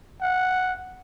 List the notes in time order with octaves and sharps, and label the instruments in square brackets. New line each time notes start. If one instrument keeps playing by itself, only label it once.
[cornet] F#5